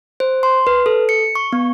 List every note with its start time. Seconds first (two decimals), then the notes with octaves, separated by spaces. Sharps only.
0.20 C5
0.43 C6
0.67 B4
0.86 A4
1.09 C#7
1.35 C#6
1.53 B3